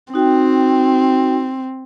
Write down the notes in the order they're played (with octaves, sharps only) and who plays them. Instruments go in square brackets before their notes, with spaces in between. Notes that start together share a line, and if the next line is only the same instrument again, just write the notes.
[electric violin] C4 [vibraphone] D#4 F#4 G5